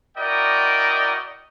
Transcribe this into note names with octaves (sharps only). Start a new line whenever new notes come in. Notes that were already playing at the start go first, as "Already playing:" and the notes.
E4 F#4 A#4 D5 D#5 G5